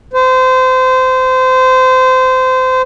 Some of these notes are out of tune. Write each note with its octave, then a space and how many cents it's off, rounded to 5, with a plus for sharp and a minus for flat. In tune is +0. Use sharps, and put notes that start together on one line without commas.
C5 -25